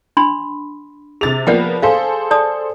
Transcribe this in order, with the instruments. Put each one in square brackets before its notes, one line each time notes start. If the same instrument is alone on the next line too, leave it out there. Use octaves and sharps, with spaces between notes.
[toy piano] D4 B5 C6
[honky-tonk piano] C3 A6 F7 [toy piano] G#4
[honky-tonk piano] F3 A#3 B3 [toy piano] D5 F#5 G5
[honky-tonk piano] G#4 A4 C5 [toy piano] F5
[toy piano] D5 A5 D#6